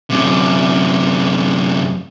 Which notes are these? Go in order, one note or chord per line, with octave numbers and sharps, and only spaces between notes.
F#2 C3